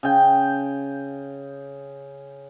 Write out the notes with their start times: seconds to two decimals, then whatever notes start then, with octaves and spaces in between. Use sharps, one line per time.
0.03 C#3 G5